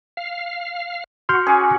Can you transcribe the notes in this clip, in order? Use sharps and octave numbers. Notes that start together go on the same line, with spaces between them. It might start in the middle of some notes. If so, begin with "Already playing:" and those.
F5
F#4 C6 F6 G6
C#4 G#4 C#5 G#5 D6